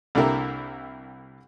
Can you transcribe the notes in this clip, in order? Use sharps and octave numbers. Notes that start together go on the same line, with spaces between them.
C2 D3 A#3 E4 G4 A#4